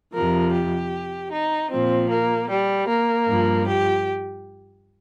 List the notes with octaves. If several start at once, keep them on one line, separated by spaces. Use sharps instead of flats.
F2 C3 F3 A#4
G4
D#4
A#2 F3 C4
A#3
G3
A#3
G2 F3
G4